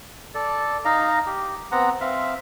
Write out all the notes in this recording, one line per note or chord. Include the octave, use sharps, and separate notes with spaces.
A4 D5
D#4 D#5 F5 A#5
G4
B3 C4 F#5 A#5
C4 E5 F5